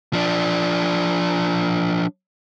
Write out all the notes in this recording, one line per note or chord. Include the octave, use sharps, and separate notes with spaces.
F3 D4